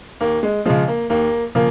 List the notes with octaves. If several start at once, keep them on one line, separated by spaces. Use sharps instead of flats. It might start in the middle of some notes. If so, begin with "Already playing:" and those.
D#2 A#3
G#3
C#3 F3 G#3
A#3
D#2 A#3
C#3 F3 A#3